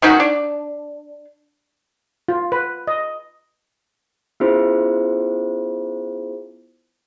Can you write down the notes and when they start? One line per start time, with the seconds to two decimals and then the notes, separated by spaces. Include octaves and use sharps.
0.02 D#3 C#4 D#4 F#4
0.20 D4
2.28 F4
2.52 B4
2.87 D#5
4.40 B3 C#4 E4 F4 G#4 C5